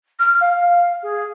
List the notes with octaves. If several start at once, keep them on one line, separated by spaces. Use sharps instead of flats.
F6
F5
G#4